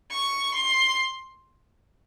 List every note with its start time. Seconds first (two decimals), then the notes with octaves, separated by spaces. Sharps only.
0.11 C#6
0.54 C6